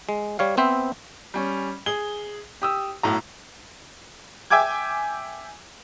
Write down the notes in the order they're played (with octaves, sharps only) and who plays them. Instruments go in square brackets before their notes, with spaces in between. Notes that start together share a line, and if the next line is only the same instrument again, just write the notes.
[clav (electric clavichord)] G#3
G3 C#5 F5
B3 C4 C5 E5
[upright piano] G3 C#4
[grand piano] G#4 [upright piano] G7
[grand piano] G4 D#6 E6
[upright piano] B1 A2 [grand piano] A#5
[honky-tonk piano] E5 G5 G#5 D6 G#6